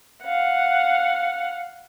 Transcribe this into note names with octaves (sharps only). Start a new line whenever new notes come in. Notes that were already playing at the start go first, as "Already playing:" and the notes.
F5 F#5